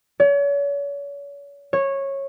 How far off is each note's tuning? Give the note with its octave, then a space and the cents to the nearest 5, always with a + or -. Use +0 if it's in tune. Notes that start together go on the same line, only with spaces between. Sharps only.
C#5 +40
C#5 -15